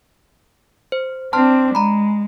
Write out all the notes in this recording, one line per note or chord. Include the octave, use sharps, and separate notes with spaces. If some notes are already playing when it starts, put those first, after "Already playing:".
C5
C4 D4 A5 C6 F6
G#3 A#5 B5